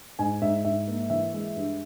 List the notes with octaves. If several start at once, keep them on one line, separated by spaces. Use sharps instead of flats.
G#2 G#5
G#2 E5
G#2 E5
A#3
E3 E5
G#3
G2